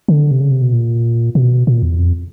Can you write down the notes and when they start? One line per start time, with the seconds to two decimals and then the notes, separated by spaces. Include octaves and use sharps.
0.08 D3
0.31 C3
0.41 C#3
0.51 C3
0.62 B2
0.73 A#2
1.35 B2
1.67 A#2
1.82 E2
1.98 F2